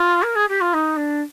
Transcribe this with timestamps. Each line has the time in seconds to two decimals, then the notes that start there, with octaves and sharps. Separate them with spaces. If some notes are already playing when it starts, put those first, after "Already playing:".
Already playing: F4
0.23 A#4
0.35 G#4
0.49 G4
0.61 F4
0.73 D#4
0.97 D4